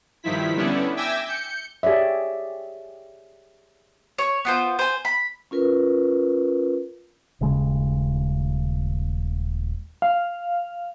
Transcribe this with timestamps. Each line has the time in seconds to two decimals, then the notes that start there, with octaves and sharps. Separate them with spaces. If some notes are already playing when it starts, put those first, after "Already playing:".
0.23 G2 D#3 F3 E4 B6
0.56 D3 G3 B3 C#4 D4 E4
0.96 E5 G5 G#5 D6 E6 A#6
1.25 G6 C#7
1.83 G4 G#4 C#5 D5 E5
4.18 C#5
4.45 B3 F4 C5
4.79 C5 G#5
5.05 B5
5.51 C#4 F4 A#4 B4
7.41 D#1 C#3 G#3
10.02 F5